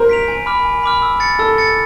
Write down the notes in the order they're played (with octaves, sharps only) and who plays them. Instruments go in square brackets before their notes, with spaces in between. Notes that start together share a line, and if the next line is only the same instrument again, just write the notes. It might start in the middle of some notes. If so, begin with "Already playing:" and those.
Already playing: [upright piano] A#4 C5
[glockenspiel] B6 D7 F7
G#5
B5 D6 F6
G#5
B5 D6 F6
E6
A6 C#7
[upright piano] A4 [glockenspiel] E6
[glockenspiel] A6 C#7